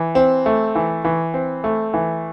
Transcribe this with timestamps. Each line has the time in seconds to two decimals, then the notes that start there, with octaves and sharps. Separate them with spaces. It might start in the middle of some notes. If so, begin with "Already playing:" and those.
Already playing: E3
0.15 C4
0.46 A3
0.75 E3
1.05 E3
1.34 C4
1.64 A3
1.94 E3